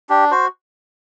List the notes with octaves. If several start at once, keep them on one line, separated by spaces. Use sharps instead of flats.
D4 G4
F#4 C5